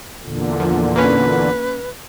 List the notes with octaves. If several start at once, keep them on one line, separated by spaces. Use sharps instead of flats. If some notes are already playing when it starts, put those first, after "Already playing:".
E2 A#2 D3
F3
A#3 C#4 B4